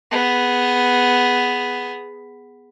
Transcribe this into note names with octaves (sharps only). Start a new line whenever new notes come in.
B3 G#4